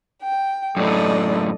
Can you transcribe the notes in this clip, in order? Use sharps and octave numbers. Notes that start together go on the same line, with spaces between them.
G5
F#2 A2 A4 D5 D#5